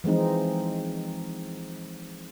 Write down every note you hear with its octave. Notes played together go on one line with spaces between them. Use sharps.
E3 F3 G#3 C4 D#4